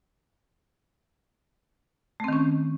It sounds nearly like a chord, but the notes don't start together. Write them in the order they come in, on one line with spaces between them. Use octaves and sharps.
A3 C4 D#3 C#4